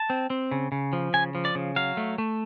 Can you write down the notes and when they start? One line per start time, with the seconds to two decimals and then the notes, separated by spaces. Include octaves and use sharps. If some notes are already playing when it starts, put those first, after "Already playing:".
Already playing: A5
0.10 C4
0.30 C4
0.51 C#3
0.72 C#3
0.93 F3
1.14 C#3 G#5
1.35 F3
1.45 D5
1.55 C#3
1.76 F#3 F5
1.97 A3
2.18 A3